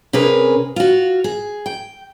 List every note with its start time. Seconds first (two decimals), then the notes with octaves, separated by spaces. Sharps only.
0.13 C3 C#4 G#4 A#4 B4
0.76 F4 F#4
1.24 G#4
1.66 G5